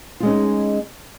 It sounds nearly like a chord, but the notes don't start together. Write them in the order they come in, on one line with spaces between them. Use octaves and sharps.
F4 G#3 C#4 D#4